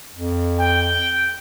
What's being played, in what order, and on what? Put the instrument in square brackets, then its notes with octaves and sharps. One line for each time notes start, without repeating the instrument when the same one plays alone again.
[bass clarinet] F2
[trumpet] G5